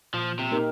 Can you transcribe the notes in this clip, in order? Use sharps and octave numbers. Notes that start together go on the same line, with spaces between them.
A#2 F3
C3
A#3 D#4 G4 A#4